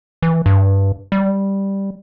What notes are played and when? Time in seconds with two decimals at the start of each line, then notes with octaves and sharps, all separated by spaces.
0.22 E3
0.46 G2
1.12 G3